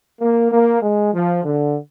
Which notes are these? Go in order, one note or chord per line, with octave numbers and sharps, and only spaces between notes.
A#3
A#3
G#3
F3
D3